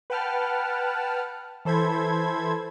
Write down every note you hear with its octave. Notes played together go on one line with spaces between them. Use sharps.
B4 F#5 G5 A5 F6
E3 A4 C5 B5 G#6